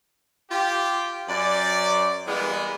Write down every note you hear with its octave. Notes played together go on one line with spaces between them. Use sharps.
F4 G4
F#2 D5
E3 G3 G#3 A#3 B3